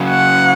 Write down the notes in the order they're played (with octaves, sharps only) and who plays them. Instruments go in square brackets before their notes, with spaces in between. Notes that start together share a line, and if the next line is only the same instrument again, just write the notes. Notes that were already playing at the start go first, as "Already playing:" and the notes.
Already playing: [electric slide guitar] C#3 F#3
[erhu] F#5